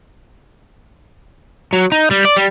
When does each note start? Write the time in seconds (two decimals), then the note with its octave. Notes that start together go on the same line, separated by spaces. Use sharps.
1.73 F#3
1.92 D#4
2.11 G3
2.25 D5
2.37 G3